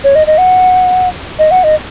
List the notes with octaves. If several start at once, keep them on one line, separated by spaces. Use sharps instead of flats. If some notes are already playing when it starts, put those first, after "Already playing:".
C#5
D#5
D#5
F#5
D#5
F#5
D#5